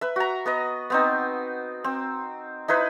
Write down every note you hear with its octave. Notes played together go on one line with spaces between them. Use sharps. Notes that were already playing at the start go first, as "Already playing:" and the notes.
B4 E5
F#4 A#5
B3 B4 D#5
B3 C4 D#4
C4
D#4 E4 B4 C5